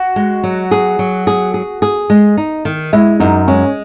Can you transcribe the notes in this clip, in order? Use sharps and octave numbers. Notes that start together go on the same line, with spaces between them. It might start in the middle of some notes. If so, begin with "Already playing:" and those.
Already playing: F#4
G#3
F#3
G#4
F#3
G#4
G#4
G#4
G#3
D#4
D#3
G#3 E4
F#2 D#4
G#3 C#4